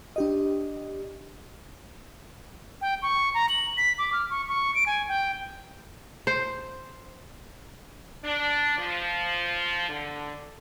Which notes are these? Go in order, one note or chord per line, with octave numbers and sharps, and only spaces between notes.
D4 G4 D#5
G5
C#6
A#5
F#7
B6
D6
F6
C#6
C#6
D7
G#5
G5
C5
D4
F3
D3